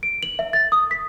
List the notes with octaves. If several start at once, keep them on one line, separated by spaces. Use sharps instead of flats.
D7
F#7
E5
A6
D#6
B6